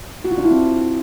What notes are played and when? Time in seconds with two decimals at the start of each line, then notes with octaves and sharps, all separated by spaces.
0.24 F#4
0.31 F4
0.38 D4
0.44 E4
0.51 C4